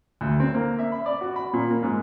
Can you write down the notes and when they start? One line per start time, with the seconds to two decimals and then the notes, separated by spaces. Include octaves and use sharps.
0.21 D2
0.40 C4
0.54 A#3
0.79 E5
0.92 B5
1.06 D5
1.21 F#4
1.36 B5
1.53 A#2
1.71 A#3
1.83 G#2